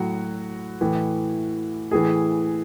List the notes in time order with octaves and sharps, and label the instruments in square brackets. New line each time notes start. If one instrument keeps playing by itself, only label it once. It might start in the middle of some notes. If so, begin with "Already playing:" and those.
Already playing: [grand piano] A2 F#3 F#4
A2 E3
A2 E3 G#4